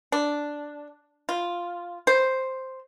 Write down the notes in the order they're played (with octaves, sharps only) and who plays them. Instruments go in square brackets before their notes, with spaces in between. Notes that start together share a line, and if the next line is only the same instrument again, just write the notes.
[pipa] D4
F4
C5